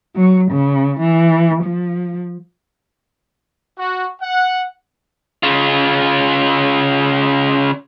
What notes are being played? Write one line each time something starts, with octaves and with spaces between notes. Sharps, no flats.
F#3
C#3
E3
F3
F#4
F#5
C#3 F4